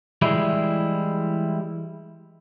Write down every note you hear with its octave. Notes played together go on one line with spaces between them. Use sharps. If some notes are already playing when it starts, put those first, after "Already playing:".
E3 G3 G#3 E4